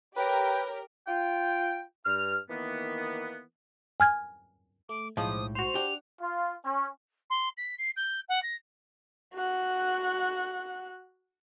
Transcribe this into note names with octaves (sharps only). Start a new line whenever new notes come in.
G4 A#4 B4 C#5 G5
F4 G5
G2 F6
D#3 E3 A#3 B3
G#5 F6 G#6
A3 D6
B1 A2 F3 G#3 D#4 D6 D#6
F#4 C5 F7
D4 G4 F#5
F4
C#4
C6
B6
C7
G6
F#5
A#6
F#4 F#5